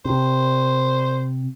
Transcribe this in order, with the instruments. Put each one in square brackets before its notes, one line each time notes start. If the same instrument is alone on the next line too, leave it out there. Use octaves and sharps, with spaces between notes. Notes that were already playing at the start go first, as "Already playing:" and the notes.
[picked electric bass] C3 [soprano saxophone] C5